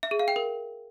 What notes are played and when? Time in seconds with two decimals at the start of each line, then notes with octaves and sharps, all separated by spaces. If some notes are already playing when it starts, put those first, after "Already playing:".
0.03 E5
0.11 G#4
0.19 F5
0.28 G5
0.36 A#4